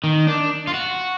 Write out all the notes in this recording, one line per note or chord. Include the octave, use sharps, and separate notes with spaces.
D#3
D4
F4
F#4